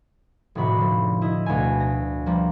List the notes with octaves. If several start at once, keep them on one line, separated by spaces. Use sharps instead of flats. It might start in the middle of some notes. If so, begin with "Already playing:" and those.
F1 A2 D#3 F#4 B5
D3 F3
E4 D#5
D2 B2 A3 F5 G#5
A#6
F3 G3 A#3